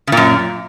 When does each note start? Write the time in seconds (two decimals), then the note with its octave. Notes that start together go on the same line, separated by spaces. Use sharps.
0.07 C#3
0.12 A#2
0.17 F#2